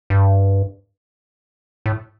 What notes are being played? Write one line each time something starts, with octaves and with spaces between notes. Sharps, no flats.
G2
A2